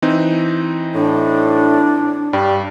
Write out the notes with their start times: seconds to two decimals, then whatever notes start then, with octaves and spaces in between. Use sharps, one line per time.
0.02 E3 C4 D#4
0.95 A2 D4
2.33 G2 G3